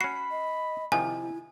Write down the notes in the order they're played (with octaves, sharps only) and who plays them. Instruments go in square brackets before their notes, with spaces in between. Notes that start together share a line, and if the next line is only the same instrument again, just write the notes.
[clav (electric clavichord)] C#4 F#4 [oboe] B5 [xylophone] C7
[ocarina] D#5
[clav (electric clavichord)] C3 D#3 F3 [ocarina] E4 [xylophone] G#5